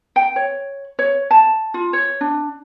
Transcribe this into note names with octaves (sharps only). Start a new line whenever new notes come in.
G5
C#5
C#5
A5
F4
C#5
D4